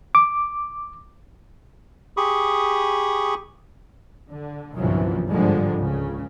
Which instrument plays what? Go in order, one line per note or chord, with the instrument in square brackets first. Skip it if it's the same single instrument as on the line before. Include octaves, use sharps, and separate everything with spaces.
[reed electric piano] D6
[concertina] G4 G#4 B5 C#6 D#6
[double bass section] D3
G1 C2 F#2 A#2 E3 F3
G1 G#2 D3 F3 G3 G#3
C#2 C#3